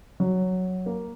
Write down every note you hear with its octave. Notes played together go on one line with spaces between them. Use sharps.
F#3
A#3